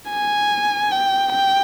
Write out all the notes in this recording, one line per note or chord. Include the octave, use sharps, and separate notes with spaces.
G#5
G5
G5